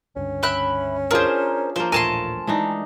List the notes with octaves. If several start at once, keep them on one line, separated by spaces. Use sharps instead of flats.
C#2 G2 D3 C#4
E5 G5 B5 F#6
D4 F4 G#4 A#4 C5
F3 A#3 C5
D#1 A1 A#2 A3 A#4 G#5 A5 C6
E3 G#3 D4 D#4